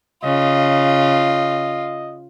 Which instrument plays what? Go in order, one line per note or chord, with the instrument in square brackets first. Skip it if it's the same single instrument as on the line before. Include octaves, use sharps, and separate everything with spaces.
[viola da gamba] C#3 [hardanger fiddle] F4 [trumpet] D#5